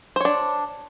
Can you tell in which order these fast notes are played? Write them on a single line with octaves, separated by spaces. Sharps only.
C5 C#5 D4